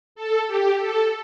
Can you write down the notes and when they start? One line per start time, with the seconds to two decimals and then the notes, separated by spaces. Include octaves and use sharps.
0.15 A4
0.47 G4
0.79 A4